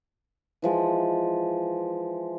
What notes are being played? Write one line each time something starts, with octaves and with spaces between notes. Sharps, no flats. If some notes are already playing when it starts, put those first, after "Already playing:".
E3 F3 G#3